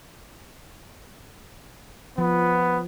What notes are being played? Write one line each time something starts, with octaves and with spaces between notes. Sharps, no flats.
F3 B3